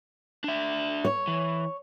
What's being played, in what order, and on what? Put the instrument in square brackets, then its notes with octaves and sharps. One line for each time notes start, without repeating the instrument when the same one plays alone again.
[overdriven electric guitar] D4 E5
[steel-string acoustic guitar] C#5
[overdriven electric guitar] E3